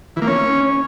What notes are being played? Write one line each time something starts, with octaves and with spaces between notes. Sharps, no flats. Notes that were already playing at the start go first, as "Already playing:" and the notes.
E3
A#3
C#4